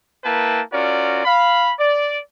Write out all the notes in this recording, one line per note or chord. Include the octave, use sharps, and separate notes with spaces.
A#3 E4 B4 G5 A5
C#4 F4 F#4 A#4 D5
F5 B5
D5